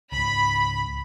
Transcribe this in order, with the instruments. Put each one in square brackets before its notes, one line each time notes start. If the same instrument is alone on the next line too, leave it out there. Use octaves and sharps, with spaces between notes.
[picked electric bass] C#2 G#2 [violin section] B5